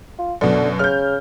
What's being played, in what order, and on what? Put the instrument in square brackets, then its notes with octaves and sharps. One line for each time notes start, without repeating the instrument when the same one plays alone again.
[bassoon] F4
[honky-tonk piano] F#2 B2 [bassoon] D3
[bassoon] C#3 [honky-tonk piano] F6 G6